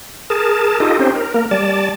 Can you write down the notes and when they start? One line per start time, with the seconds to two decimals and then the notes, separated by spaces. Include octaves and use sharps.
0.30 G#4 A#4 A5
0.80 D#4 F4 G4 A4 D#5
0.99 C4 C#4 D#4 G4 C5
1.15 A#4
1.34 A#3 A#4
1.51 G3 D5 A5